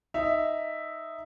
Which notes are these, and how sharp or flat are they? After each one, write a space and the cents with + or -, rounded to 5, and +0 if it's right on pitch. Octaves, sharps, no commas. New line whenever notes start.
D#4 +0 E5 +0